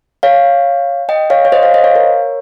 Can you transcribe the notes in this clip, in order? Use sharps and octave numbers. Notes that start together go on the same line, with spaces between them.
C#5 F5
D#5 G5
C#5 F5
C#5
C5 D#5
C#5 F5
C5 D#5
C#5 F5
A#4 C#5